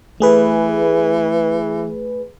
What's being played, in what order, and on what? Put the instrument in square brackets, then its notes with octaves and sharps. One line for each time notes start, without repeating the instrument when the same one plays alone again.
[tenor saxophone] E3 [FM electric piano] A3 G#4 B4